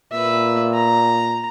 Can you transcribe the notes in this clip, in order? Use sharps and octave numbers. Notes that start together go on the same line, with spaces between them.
A#2 B4 E5
A#5